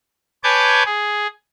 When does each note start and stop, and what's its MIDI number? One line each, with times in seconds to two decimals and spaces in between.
0.44 0.83 71
0.44 0.83 73
0.44 0.83 80
0.44 0.83 81
0.44 0.83 86
0.44 0.83 91
0.85 1.27 68